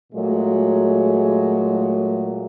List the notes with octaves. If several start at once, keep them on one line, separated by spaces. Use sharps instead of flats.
A#2 F#3 G#3 A3